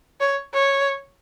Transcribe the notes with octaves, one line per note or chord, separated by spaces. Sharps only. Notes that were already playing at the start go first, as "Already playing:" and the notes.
C#5
C#5